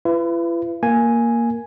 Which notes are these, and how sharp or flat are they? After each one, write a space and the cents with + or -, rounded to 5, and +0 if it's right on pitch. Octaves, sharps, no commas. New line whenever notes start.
E4 +45 B4 +20
A#3 +0 G#5 +0